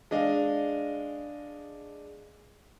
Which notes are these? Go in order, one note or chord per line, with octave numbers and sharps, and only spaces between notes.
G#3 D4 D#5 F5